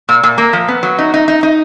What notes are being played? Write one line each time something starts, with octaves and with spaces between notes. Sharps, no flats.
A#2
A#2
A#3
F3
B3
F#3
D#4
D#4
D#4
D#4